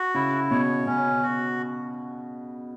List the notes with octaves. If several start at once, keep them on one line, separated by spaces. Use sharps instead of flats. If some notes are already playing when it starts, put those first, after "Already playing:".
Already playing: F#4
C#3 E4
B2 C#5
B2 C#4
F#4